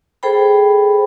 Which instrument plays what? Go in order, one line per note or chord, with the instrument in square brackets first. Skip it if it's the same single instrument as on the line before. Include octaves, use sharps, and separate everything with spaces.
[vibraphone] G#4 A4 C5 G5 B5